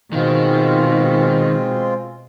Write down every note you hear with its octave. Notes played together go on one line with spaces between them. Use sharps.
B2 D#3 G#3 C4 F4